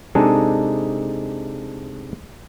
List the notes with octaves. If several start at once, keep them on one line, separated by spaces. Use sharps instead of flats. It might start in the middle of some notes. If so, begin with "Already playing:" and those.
C3 G#3 D4 D#4 G#4 A4